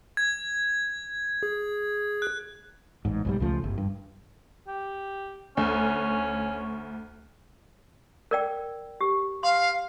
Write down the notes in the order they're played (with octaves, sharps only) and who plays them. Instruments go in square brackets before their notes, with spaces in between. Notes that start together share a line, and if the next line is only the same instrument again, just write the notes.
[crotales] G#6
[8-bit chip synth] G#4
[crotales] F#6
[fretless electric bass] A1 G#2
B1 G#2 G3
C#2 C#3 F3 A3
G1
G2
[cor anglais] G4
[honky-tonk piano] D2 [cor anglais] C#4
[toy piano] A#4 D5 G5
G4
[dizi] F5 [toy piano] C6